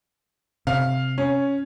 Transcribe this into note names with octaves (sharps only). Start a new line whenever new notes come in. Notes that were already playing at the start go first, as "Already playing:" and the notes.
C3 F5
C#4